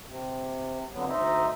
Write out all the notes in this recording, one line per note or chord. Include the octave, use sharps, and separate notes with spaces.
C3
F2 D3 F#3 B3
D2 D#4 C5 D#5 E5 A#5